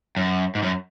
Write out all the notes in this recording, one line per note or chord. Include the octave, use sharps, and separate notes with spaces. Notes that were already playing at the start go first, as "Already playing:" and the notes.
F#2
G#2
F#2